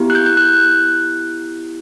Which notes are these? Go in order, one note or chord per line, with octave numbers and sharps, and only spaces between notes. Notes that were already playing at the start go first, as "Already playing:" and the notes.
Already playing: B3 E4 G4
F#6
G6
G6
F#6